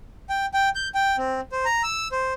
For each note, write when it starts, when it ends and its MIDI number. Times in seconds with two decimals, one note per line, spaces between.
0.29 0.46 79
0.54 0.69 79
0.75 0.88 91
0.95 1.16 79
1.18 1.41 60
1.52 1.65 72
1.65 1.82 82
1.83 2.08 88
2.12 2.34 72